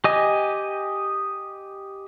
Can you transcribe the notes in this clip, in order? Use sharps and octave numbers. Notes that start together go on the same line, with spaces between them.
G4 D#5 G#5